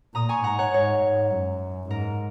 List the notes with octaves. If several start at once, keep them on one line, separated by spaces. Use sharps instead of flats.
A#2 A#5 D#6
G#5 C#6
G#2 F#5 A#5
C#5 F#5
G#2 C#5
G#2
F#2
G#2 A#4